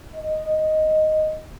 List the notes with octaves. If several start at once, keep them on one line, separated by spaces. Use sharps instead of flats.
D#5